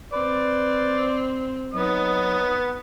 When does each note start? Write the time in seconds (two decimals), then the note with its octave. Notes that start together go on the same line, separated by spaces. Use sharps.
0.13 C4 B4 D5
1.73 F#3 B3 D#4 D#6